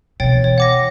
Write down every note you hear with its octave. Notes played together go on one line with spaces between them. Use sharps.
B2 E3 C#5 G5 A6
C#5
F#5 D6 A#6